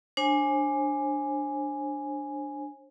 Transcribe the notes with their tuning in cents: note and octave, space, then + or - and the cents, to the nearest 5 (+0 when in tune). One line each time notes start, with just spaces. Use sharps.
D4 +0 C5 +40 G#5 +0